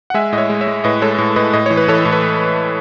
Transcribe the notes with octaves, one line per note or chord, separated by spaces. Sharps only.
F#5
G#3 E5 G#5
A2 D#5
C#5 E5
G#3
C#5 E5
G#3
A2 B4 D#5
G#3 A4 C#5
A2
A2 B4 D#5
A2 D#5
E3 C#5
B4
E3 A4 C#5
A2
B4